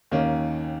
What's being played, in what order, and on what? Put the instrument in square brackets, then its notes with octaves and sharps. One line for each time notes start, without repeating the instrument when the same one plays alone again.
[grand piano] D#2 D#3 A#3 C#4